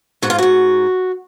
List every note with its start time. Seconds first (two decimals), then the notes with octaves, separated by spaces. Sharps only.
0.22 G#2 F#4
0.30 F4
0.38 G#2 F#4